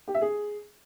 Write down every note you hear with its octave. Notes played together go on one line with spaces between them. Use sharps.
G4
E5
G#4